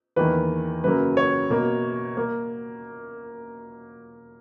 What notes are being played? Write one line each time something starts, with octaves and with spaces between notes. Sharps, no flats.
E2 D#3 A#3 B4
F#2 C#3 F#3 A#3 B4
C#5
B2 A#3
A#3